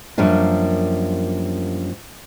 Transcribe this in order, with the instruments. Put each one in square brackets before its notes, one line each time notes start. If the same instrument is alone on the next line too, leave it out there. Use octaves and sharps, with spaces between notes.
[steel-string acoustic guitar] F#2 F3 G3 A#3 D4